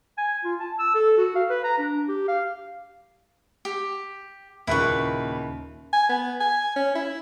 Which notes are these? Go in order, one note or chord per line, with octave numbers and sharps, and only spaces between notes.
G#5
F4
A5
E6
A4
F#4
F5
B4
A#5
D4
G4
F5
G4
D#2 A#2 C#3 E4 B4 C#6
G#5
B3
G#5
C#4
E4